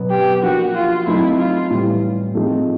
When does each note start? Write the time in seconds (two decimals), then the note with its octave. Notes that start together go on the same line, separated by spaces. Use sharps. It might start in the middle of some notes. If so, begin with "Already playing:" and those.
Already playing: B2 F#3 B3
0.11 G4
0.42 F3 A#3 D4 F#4 G4
0.75 F4
1.06 F#3 A3 C4 D#4 E4
1.38 F4
1.70 A2 E3 G3
2.35 F3 A3 C4 D#4 G#4